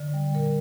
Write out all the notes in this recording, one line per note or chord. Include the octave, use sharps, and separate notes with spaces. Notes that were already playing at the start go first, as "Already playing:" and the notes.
Already playing: D3
G3
A#2 A#4